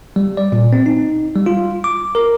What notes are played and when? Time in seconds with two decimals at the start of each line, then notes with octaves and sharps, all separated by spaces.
0.16 G3
0.37 D5
0.52 A#2
0.73 C4
0.86 D#4
1.35 G3
1.46 F4
1.84 D6
2.15 A#4